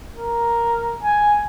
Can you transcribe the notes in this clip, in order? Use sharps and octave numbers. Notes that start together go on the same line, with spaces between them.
A#4
G#5